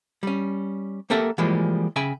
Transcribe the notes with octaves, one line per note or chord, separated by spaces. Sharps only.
G3 C#4
A#3 G4 A4 A#4 E5 F#5
E3 F3 G3 G#3 A#3
C#3 E5 G5 G#5 B5